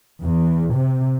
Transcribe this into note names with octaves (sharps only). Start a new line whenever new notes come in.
E2
C3